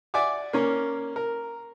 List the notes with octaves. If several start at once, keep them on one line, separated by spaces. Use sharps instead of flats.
D5 E5 F#5 G#5 D6
A#3 C#4 A#4
A#4